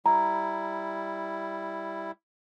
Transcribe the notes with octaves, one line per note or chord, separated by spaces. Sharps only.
G3 E4 A#5